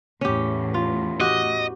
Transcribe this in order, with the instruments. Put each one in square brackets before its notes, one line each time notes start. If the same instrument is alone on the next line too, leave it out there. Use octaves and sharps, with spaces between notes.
[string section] E2 A2 [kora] C#4 G4
[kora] F4
[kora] F#4 G4 [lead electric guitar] D#5